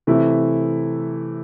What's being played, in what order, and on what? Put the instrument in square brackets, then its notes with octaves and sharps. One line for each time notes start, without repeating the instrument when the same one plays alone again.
[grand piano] C3 E3 A3 E4